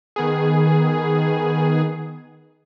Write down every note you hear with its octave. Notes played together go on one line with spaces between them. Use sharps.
D#3 B3 G#4